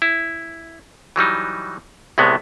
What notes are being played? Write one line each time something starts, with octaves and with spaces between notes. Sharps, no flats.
E4
E3 F#3 G3 D#4
C2 A2 C3 G#3 B3